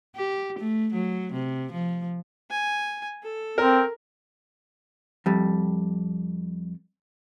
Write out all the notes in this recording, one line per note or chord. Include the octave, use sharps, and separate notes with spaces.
G4
A3
F#3
C3
F3
G#5
A4
C4 A#4
F2 G3